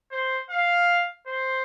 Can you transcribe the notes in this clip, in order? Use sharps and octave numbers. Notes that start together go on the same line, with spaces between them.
C5
F5
C5